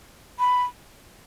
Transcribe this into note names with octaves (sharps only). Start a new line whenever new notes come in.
B5